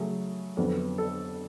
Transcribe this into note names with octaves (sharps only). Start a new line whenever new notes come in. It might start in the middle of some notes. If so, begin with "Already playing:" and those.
Already playing: C#3 F#3 A3 G#4
F2 D3 F#3 B3
A4